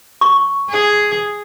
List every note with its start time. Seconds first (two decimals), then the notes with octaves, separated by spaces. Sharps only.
0.21 C#6
0.70 G#4